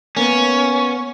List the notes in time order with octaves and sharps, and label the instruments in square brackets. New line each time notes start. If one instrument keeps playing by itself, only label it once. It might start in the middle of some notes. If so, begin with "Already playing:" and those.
[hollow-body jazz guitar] A#3 B3 [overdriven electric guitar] C#4